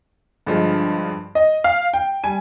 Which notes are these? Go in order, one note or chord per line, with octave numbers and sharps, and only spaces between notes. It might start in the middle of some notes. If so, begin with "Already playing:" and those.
G2 D3 F3 G#3
D#5
F5
G5
G3 G#5